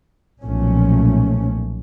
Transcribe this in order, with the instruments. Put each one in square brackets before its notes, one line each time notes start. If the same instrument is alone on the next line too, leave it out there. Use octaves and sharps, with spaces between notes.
[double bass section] B1 A#2 F3 A3 C#4